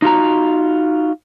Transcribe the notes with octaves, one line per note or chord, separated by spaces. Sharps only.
D#4 F4 F#4 A#5